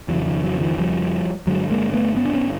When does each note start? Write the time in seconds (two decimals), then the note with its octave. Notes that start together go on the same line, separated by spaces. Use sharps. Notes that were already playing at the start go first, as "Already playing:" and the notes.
0.08 F2 C#3 E3 F#3
0.26 D#3 F3
0.43 E3 F#3
0.60 D#3 F3
0.78 F3 G3
1.47 G2 D3 F#3 G#3
1.70 G#3 A#3
1.93 A3 B3
2.17 B3 C#4
2.25 D4
2.33 B3 C#4